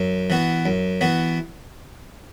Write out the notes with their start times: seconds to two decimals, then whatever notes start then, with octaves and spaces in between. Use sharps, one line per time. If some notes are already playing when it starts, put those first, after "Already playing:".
Already playing: F#2
0.30 E3 B3 F#4
0.66 F#2
1.01 E3 B3 F#4